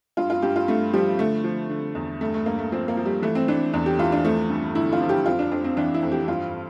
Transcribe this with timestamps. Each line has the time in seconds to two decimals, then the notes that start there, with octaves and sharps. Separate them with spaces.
0.17 G2 F4
0.30 F4
0.42 G2 G4
0.56 F4
0.68 G2 A3
0.94 F3 G3
1.19 D3 A3
1.44 F3
1.70 D3
1.95 E2
2.21 G2 A3
2.34 A3
2.46 G2 A#3
2.59 A3
2.72 F3 C4
2.88 A#3
2.97 F3
3.06 G3
3.22 E3 A3
3.35 C4
3.48 E3 D4
3.73 E2 D4
3.86 G4
3.99 E3 F4
4.12 D4
4.25 F3 A3
4.49 G2
4.75 D3 E4
4.93 F4
5.01 F3
5.09 G4
5.26 F2 F4
5.39 D4
5.51 F2 D4
5.64 C4
5.77 E3 D4
5.94 E4
6.03 F2
6.12 G4
6.28 G2 F4